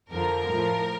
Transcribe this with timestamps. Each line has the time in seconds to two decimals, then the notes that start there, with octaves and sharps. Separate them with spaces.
0.11 F2 D3 F3 A#4
0.50 A2 F3